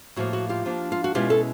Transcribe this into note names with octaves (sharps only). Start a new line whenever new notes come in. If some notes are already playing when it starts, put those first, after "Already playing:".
A2 F3 A#3 F#4
F#4
F4 G4
F3 A#3 D4
F4
F#4
B2 G#3 C#4 E4 F4 G4
A4